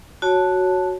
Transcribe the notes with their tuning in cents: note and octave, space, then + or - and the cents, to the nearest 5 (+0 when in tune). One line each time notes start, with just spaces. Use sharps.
F#4 +0 C#5 +0 A5 +0